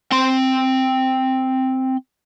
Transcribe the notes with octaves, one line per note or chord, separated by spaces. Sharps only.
C4 C6